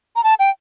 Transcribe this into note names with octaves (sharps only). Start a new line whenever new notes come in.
A#5
A5
G5